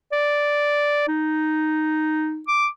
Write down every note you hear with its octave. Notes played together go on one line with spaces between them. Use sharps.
D5
D#4
D6